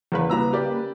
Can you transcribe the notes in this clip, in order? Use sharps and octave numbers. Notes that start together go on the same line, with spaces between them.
E2 C#3 A#3 B4
C2 A#5 E6
G4 A#4 D5